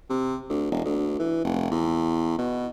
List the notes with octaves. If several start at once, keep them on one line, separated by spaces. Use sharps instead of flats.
C3
D2
E1
D2
E3
F1
E2
B2